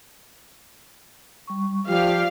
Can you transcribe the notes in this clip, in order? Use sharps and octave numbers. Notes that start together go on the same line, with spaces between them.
G3 C#6
F3 F4 G4 D5 F5